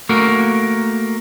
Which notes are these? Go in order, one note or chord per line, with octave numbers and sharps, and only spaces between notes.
A3 A#3 F#4 A#4